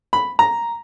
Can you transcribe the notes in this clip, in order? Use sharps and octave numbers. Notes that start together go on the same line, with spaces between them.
B5
A#5